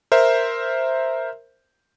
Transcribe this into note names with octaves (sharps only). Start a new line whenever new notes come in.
A#4 C5 E5